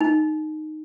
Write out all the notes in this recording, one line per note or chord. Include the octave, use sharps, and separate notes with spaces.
D#4